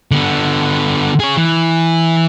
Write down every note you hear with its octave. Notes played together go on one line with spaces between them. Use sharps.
D3 B3
G#4 C#5
E3